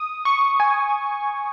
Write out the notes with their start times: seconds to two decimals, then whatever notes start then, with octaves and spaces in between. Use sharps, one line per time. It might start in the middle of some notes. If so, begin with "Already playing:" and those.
Already playing: D#6
0.25 C#6
0.60 G#5